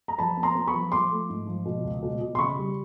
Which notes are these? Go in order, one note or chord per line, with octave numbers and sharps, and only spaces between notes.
A#5
F3 A5 B5
B3
A#5 C6
B3
B5 C#6
F3
F3 C6 D6
A3
G#2
F3
B2
C#2
B2
B2
C6
C#3 B5 C#6
G3